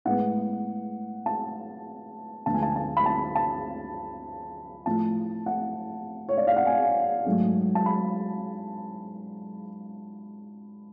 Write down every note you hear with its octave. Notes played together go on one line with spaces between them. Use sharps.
A2 G#3 B3 F#5
A5
D2 D3 F3 G#3 B3 A5
G#5
A5
A5
B5
A5
A5
A2 F3 A3 A5
F#5
C#5
D5
F5
F#5
G#5
G#2 F#3 A3
A5
B5